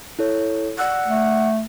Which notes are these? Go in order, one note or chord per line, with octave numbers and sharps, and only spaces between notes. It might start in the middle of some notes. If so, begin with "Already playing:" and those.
E4 A4 C#5
D5 F#5 E6 F#6
A3